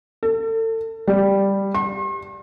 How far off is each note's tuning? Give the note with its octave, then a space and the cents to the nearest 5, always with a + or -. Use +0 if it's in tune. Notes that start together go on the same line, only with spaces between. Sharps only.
A4 +35
G3 +5
C6 +45